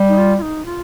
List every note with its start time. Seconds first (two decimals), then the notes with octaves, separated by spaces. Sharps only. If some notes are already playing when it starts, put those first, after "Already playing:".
Already playing: G3
0.09 D#4
0.18 F4
0.38 F4
0.42 D#4
0.66 F4